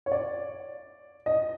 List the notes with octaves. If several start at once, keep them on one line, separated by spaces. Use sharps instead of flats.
C#5
D5
D#5